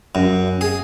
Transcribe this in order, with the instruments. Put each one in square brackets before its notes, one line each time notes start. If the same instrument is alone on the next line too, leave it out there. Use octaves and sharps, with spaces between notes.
[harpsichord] F#2
G#4